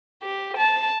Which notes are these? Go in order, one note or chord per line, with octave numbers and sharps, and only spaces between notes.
G4
A5